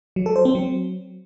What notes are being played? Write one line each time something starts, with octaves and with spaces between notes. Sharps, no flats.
F#3
A4
C5
C4
F#3